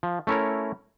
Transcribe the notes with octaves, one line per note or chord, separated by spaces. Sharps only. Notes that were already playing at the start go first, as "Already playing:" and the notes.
F3
A3 C#4 E4 A#4 C#5